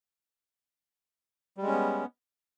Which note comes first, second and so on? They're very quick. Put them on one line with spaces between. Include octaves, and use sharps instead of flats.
G3 G#3 C#4 B3